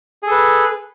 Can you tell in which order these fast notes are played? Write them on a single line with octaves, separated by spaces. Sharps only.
G#4 A4 B4